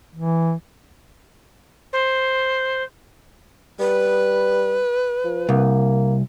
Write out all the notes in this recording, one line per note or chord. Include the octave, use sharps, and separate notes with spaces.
E3
C5
G3 B4
F3
C2 A#3